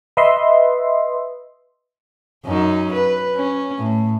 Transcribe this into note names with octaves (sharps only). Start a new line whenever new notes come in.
B4 D#5 E5 C6
F#2 C#4 D#4
B4
C#4
A2